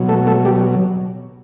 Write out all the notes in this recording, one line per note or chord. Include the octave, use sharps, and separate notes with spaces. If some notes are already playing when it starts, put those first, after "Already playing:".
Already playing: B2 F#3
A3 A4
A3 A4
G3 G4